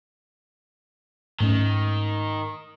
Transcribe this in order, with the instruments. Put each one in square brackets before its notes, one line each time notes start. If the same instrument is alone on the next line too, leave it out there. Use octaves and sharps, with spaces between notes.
[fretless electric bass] G#2 A3 C#4 [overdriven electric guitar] D#3